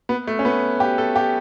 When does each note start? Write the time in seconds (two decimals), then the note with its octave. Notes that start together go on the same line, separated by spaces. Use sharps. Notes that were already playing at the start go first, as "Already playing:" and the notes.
0.09 B3
0.27 A3
0.39 C#4
0.45 B3
0.80 G4
0.98 A4
1.16 G4